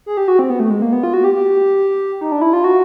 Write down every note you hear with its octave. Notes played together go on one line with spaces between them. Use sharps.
G#4
G4
F#4
C4
B3
A3
G#3
A#3
B3
F4
F#4
G4
G4
D#4
D4
E4
F4
F#4